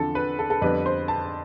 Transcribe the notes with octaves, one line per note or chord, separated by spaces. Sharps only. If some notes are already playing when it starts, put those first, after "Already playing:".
Already playing: E2 D3 F3 C4 A4
B4
A4
A4
F2 D3 G3 B3 D4 B4
C5
A5